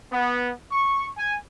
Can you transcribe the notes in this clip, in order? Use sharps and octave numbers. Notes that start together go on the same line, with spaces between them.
B3
C#6
G#5